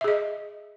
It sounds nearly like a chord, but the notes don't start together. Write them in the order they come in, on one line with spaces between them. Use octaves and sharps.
E5 G#4 D#5